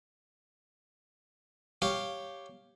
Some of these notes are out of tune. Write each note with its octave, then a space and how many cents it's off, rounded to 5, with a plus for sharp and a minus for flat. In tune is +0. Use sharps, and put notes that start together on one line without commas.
G4 +0 C#5 +0 F5 +0